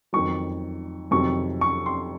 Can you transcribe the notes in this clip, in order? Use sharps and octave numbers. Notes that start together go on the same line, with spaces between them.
F2 D#3 F#3 C#6
F2 C3 D#3 F#3 C#6
C#6
C6